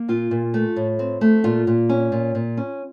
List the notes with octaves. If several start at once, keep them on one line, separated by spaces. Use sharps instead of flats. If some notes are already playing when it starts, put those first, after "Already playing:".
Already playing: A#3
A#2 F4
A#2
A3
A2
C4
A3
A#2 F4
A#2
C#4
A#2
A#2
C#4